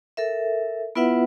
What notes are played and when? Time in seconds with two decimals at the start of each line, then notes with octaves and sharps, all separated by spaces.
0.17 A4 A#4 E5
0.95 B3 E4 F4 B4 E5 F#5